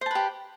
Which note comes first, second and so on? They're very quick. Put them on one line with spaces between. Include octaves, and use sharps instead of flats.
C5 A5 B4 G4